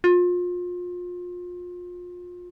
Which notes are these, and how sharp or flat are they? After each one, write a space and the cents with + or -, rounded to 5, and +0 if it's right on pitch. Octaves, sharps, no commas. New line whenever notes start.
F4 +30